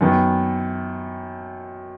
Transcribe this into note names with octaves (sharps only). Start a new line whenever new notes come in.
F#2 D#3 B3